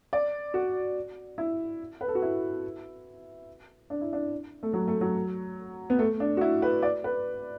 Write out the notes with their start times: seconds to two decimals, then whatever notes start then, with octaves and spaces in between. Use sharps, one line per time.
0.13 D5
0.54 F#4
1.38 E4
2.01 B4
2.08 A4
2.15 F#4
2.22 E4
3.90 D4
4.01 E4
4.13 D4
4.63 A3
4.73 F#3
4.88 A3
5.01 F#3
5.90 B3
5.99 A3
6.20 D4
6.37 F#4
6.41 E4
6.62 B4
6.83 D5
7.04 B4